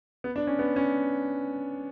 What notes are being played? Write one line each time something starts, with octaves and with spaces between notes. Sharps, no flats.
B3
D4
C#4
B3
C#4